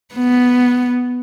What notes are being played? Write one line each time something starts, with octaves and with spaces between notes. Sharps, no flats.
B3